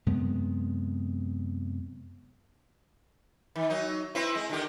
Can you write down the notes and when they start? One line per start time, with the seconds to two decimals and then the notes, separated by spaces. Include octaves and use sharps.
0.06 F#2 C3 G#3 B3
3.56 D#3
3.70 F#3 D#4
4.15 C4 E4 B4
4.36 G#3
4.50 D3 D#3 G4